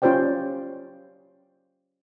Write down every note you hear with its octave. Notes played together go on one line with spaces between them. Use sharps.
C#4 F4 G4 C5 D5 G5